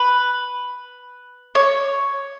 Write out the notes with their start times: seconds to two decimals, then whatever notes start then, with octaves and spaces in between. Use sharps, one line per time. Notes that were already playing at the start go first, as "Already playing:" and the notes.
Already playing: B4
1.55 C#5